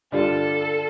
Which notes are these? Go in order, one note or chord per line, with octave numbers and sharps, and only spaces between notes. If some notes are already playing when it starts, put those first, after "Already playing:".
G2 D3 G3 D4 F4 A4